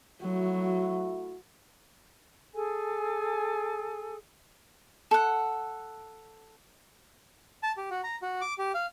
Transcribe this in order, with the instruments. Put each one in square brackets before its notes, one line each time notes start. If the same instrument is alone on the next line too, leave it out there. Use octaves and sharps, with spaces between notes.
[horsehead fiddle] F#3 [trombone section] A3 E4 F#4
[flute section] G#4 A4 G#5
[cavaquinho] A4 F#5
[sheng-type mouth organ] A5
G4
F#4
A#5
F#4
D6
G4
F5